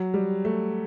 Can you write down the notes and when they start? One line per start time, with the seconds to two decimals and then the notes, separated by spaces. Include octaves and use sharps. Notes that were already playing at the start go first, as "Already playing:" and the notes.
Already playing: F#3
0.14 G3
0.45 A3